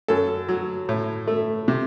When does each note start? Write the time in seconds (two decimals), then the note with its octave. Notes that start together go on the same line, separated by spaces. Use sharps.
0.08 F#2 A4
0.49 F#3
0.89 A2
1.27 A3
1.68 C3